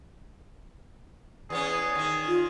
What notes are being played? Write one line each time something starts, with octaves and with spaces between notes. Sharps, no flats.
E2 B3 C#4 G#4
D#3 D#4
F4